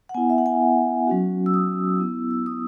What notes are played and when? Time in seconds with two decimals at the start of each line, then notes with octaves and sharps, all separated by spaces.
0.09 F#5
0.15 B3 E4 G#5
0.30 E5
0.38 F#5
0.46 G#5
1.07 F#3 C#4 F#4
1.46 E6
1.54 D#6
1.99 B3 E4 E6
2.31 E6
2.46 D#6